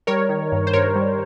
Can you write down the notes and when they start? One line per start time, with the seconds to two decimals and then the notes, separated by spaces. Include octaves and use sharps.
0.07 G3 A#4 C#5
0.29 D#3
0.52 G2
0.67 C5
0.73 G2 A#4 C#5
0.96 G3